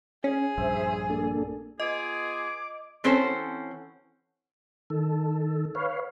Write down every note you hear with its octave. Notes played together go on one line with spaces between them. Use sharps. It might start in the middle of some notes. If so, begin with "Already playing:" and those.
C#4 G#4
A#1 G2 C5 E5
A#3 D4 A4
B3 F4 G#4 D#5 D6
E3 C4 C#4 F#4 A4 C5
D#3 A4
B4 C#5 F5